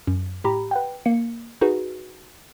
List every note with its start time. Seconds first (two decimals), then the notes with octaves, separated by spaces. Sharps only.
0.07 F#2
0.44 A2 G4 A#5 B5
0.71 B4 F#5 G5
1.06 A#3 C#7
1.61 D#4 F#4 G#4 B4